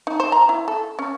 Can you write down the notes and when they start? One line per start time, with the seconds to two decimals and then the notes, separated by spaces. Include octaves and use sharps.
0.07 D#4
0.20 C5
0.32 A#5
0.49 E4
0.68 A4
0.99 C#4